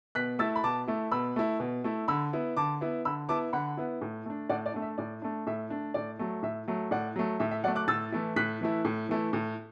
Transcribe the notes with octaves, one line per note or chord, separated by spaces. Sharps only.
B2 F#6 B6
A3 E4 E6 A6
B5
B2 A5 D6
A3 E4
B2 B5 E6
A3 E4
B2
A3 E4
D3 B5 E6
B3 E4
D3 A5 D6
B3 E4
D3 B5 E6
B3 E4 A5 D6
D3 F#5 B5
B3 E4
A2
A3 D4
A2 D5 F#5
D5
A3 D4
E5
A2 D5
A3 D4
A2 E5
A3 D4
A2 D5
F#3 A3
A2 E5
F#3 A3
A2 D5 F#5
F#3 A3
A2 E5
E5
F#3 A3 D5 F#5
D6 F#6
A2 E6 A6
E3 A3 E4
A2 F#6 B6
E3 A3 E4
A2
E3 A3 E4
A2